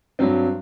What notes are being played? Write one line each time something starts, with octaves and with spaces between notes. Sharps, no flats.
G2 F#3 C4